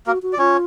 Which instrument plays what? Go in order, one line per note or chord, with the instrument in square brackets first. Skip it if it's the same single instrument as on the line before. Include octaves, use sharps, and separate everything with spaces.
[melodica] A#3 A#4 [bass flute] F#4
[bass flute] F#4
[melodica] D5
[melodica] C#4 C#5 [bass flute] F4